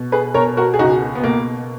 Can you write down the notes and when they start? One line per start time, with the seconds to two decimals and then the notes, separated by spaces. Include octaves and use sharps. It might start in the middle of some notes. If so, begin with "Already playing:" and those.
Already playing: B2
0.12 G#4 B4
0.34 B2 A#4 C#5
0.57 F#4 A#4
0.74 G#4
0.79 C#2 D#4 F#4
1.15 B3
1.24 B2 A#3